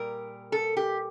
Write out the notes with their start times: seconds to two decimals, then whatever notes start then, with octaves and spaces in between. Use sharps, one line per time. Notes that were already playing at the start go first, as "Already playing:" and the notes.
Already playing: A#2 G3 A#4
0.52 A4
0.77 G4